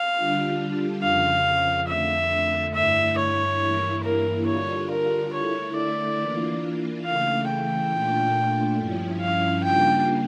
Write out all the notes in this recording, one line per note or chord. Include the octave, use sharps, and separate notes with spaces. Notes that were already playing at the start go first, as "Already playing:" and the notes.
Already playing: F5
D3 G3 D4 F4
F2 C#3 F3 F5
F2 D3 A3 E5
G2 D3 A3 E4 E5
C#5
G2 E3 A#3 E4
A#4
D3 G3 D4 F4 C#5
A#4
D3 A3 E4 C#5
D5
E3 A#3 D4 F4
C#3 E3 A3 F5
G5
A#2 A3 D4 F4
G2 F3 C#4 E4
F5
C#3 G3 A#3 D4 F4 G5